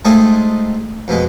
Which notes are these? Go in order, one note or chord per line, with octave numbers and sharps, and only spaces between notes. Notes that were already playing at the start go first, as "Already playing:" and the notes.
G#3 A3 C4 D#4 F4 G#4
F2 B2 G#3